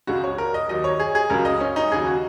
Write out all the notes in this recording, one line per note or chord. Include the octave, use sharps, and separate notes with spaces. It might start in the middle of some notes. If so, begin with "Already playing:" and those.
C#2 C#3 G#3 F#4
C#5
A#4
D#5
D#2 D#3 F#3 D#5
C#5
G#4
G#4
C#2 C#3 F#3 A#4
D#5
C#4
D#4
D#2 C#3 F#3 G#4
F#4